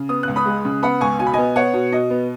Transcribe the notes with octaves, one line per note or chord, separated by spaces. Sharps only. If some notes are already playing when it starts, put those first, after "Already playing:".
Already playing: C#3
B3 D#6
C#2 F#6
B5 D#6
G#3
C#3
B3 F#5 B5
C#2 G#5 C#6
B2 G#5
B5
B3 D#5 G#5
B3 C#5 F#5
B2
B2 D#5
B3